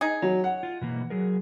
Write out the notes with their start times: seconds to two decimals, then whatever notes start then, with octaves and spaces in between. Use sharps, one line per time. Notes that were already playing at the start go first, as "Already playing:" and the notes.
0.01 D#4 G#4
0.22 F#3 C#5
0.44 F#5
0.63 F4
0.81 B2 E3 A#3
1.10 F#3 G#4 A#4